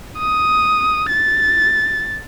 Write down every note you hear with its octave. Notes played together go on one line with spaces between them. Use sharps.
D#6
A6